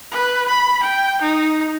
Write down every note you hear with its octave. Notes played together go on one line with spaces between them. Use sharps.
B4
B5
G5
D#4